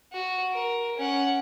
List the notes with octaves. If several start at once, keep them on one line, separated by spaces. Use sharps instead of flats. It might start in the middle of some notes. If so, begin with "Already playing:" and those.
F#4
A#4
C#4 F#5